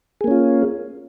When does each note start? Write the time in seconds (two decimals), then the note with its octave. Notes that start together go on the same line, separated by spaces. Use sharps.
0.21 G#4
0.24 A#3
0.28 C#4
0.31 F4